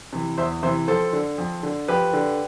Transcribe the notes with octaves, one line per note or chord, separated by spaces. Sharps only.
C3 E3
E2 C5 E5
C3 E3 C5 E5
F2 A4 C5
D3
F2
D3
F2 G4 B4
D3